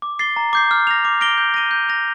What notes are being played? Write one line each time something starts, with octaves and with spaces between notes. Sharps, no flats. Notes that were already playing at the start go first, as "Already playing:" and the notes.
D6
A6 C7 G7
A#5
D6 G6 C7
F6
A#6 F7
D6
F6 A#6 D7 G7
G6
A#6 D#7 G7
G6
A#6 F7